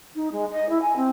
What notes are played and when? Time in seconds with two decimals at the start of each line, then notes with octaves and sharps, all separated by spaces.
0.15 D#4
0.32 G#3
0.52 D#5
0.69 E4
0.82 G#5
0.96 C4